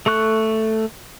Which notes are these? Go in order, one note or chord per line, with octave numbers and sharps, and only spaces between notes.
A3 A4 C#6 F#6